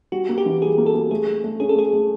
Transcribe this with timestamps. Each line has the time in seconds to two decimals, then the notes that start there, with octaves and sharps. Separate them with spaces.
0.12 G3 F#4
0.29 A#3
0.38 G4
0.46 E3
0.62 G3 G#4
0.78 A#3
0.86 A4
0.95 A#3
1.11 A3 G#4
1.27 A3
1.44 A3
1.60 C#4 G#4
1.69 A4
1.76 A3 G#4
1.93 A3